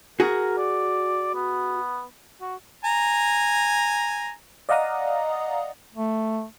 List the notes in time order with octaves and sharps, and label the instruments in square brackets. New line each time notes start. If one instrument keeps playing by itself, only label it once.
[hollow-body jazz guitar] F#4 G#4 [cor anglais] A#4
[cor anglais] D5
B3
F#4
[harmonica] G#5 A#5
[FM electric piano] D5 D#5 F5 F#5 A#5 D#6
[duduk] A3